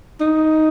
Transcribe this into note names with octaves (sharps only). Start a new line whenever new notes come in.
D#4